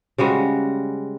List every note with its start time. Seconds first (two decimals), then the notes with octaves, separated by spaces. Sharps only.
0.18 C#3 G3 G#3 F#4